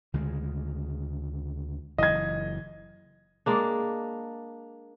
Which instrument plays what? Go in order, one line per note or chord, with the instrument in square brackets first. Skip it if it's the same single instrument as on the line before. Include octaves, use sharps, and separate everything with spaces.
[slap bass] D2 C#3 G#3
[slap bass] F#1 E3 [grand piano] D#5 G#6
[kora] G#3 A#3 D4